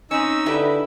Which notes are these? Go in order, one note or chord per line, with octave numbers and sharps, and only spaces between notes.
C4 C#4 D#4 E6
D3 E4 G4 B4